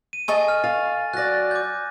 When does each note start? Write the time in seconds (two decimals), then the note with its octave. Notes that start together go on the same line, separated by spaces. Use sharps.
0.13 D#7
0.28 A4 D#5 G#5 C#6
0.48 F6
0.64 F5 A6
1.13 F#3 D5 F#6 A#6
1.51 D6 G6